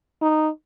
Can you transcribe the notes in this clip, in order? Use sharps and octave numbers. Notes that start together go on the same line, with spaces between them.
D#4